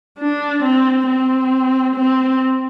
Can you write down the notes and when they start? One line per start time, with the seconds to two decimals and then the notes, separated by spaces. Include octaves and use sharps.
0.19 D4
0.63 C4
1.08 C4
1.96 C4